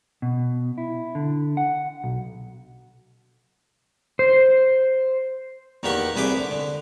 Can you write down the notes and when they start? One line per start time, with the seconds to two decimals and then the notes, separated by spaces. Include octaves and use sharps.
0.22 B2
0.78 E4
1.15 D3
1.57 F#5
2.04 B1
4.19 C5
5.83 E2 D#3 A#3 G4 F#5 C#6
6.16 C2 E4 G#4 B4 G5 D6
6.38 D3
6.51 D3